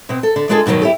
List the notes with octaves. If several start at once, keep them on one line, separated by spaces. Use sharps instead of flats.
B2 C4
A4
D3
G#3 B3 D4 F4 G#4 A4
G2 B2 D#3 E3 F#3
E4 G4 A4